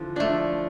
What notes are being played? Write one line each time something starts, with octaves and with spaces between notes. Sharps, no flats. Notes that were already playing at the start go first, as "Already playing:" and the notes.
Already playing: D3 E3 F3
F3 A3 D4